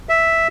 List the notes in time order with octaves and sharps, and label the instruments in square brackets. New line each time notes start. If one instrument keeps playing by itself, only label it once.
[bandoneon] E5